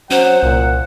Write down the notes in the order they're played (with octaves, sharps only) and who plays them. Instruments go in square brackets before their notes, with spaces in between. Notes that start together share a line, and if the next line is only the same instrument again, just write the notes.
[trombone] F#3 [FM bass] C#4 [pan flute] C5 [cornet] F#5
[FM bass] C2 [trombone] A#2